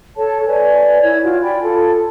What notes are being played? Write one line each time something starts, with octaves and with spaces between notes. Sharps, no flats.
A4 C#5 A5
B4 C#5 D5 G#5
E4 C#5 G#6
F4 F#4
D5 G5 G#5 B5
F4 A4 A5